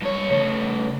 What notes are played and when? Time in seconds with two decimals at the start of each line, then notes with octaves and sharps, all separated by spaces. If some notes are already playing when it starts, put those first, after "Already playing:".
0.02 G2 C#5
0.31 C#3 A3